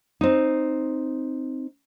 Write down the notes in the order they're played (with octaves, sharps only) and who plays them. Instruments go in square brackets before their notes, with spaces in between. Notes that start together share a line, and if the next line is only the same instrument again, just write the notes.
[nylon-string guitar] C4 D#4